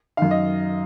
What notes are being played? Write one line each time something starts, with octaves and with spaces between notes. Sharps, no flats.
F#2 D#3 F5
D#5